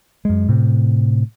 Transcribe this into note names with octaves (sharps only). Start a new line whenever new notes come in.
F#2 G#3
A2 C3